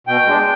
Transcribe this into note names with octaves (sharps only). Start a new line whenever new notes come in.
B2 G5
G#3 D4